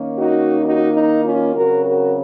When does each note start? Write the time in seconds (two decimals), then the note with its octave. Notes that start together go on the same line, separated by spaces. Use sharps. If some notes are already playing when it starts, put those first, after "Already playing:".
Already playing: D#3 A#3 C#4
0.18 D#4 F#4
0.63 D#4 F#4
0.93 D#4
1.24 C#4 F4
1.54 C#3 F#3 C4 F#4 A#4
1.86 F#4 A#4